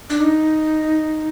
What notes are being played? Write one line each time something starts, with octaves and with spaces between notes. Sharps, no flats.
D4
D#4